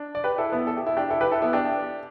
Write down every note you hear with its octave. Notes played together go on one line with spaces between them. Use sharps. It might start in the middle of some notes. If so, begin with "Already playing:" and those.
Already playing: D4
D5
G4 B4
E4 A4
B3 E4
A4
G4
E4
D4 G4
E4 A4
G4 B4
E4 A4
B3 E4
D4 G4